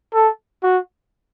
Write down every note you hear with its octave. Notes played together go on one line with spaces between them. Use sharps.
A4
F#4